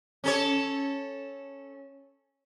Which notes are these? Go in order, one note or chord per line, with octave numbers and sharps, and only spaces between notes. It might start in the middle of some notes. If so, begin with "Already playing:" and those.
C#4 A4 C#5